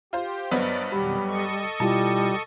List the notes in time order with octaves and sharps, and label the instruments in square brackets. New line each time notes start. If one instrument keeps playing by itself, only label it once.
[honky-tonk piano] F4 C5 [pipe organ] G4
[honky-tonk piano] G2 F#3 B3 [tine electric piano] B4 C5 D#5 [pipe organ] D5
[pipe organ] F2 B2 D#3 [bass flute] G3 [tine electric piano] G4 B5
[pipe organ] A4 D#5 C#6
[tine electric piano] B2 E4 F4 [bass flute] G3 [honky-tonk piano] A5